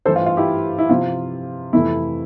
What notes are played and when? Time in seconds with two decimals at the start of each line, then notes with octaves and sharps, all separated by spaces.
0.06 G2 E3 A3 C4 A4 C5
0.16 F4
0.26 F4
0.37 E4 G4
0.79 E4
0.89 C3 F3 C4 F4
1.73 F2 C3 E3 A3 E4